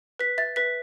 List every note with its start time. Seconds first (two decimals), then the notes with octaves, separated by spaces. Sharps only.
0.19 B4 B6
0.38 E5 A6
0.56 B4 B6